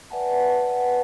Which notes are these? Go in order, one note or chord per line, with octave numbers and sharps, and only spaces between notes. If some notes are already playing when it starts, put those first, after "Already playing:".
B4 D5 E5 F#5 G#5 A5